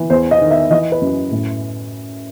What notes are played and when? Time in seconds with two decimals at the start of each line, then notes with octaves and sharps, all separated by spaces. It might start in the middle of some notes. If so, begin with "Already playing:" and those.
Already playing: E3
0.10 E2 C5
0.31 D#5
0.41 D#3
0.51 E5
0.71 E3 D#5
0.92 B4
1.01 F#2
1.32 A2